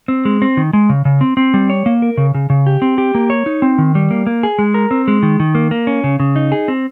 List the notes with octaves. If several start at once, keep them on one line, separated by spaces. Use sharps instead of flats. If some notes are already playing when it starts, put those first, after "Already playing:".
C4
G#3
C4
D#3
G#3
C#3
C#3
C4
C4
G3
C#5
A#3
A#4
C#3
C#3
C#3
G4
C4
G4
A#3
C#5
D#4
C4
D#3
G3
A#3
A#3
G#4
G#3
A#4
C4
G#3
D#3
D#3
A#3
A#3
C#4
C#3
C#3
D#4
G#4
C4